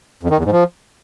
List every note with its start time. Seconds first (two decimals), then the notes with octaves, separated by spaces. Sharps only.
0.23 F2
0.30 D#3
0.37 E2
0.45 G#2
0.52 F3